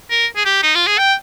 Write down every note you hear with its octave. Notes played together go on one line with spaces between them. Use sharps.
A#4
G#4
G4
D#4
F4
G#4
G5